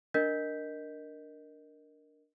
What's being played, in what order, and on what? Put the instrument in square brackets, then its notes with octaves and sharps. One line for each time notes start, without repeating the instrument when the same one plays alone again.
[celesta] D4 A#4 D#5 G6 B6